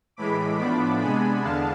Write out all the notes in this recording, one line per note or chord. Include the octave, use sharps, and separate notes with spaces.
A2 E3 G#3 B5 D6
A2 F3 B3 D4 B5 D6
C3 G#3 B3 D4 G#5 B5
E2 D3 G#3 B3 D4 F5 A5